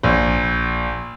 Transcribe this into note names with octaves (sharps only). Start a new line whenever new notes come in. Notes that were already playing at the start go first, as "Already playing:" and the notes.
A#1